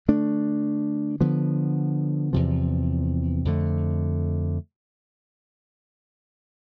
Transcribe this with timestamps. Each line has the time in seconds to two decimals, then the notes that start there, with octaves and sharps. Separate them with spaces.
0.08 D3 A3 D4
1.20 D3 F3 B3
2.33 E2 C3 F3
3.45 F2 D3 A3